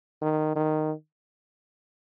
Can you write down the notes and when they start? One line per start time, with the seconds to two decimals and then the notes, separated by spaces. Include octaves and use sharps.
0.21 D#3
0.56 D#3